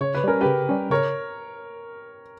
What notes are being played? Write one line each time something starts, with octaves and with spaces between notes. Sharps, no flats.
C#3 C#5
B4
G3 C#4 A#4
C#3 G4 B4
G3 C#4
C#3 A#4 C#5